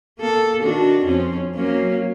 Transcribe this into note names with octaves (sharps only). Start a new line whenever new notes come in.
A#3 A4
D#3 D4 F#4
F2 C4 C#4
F#3 A#3 C#4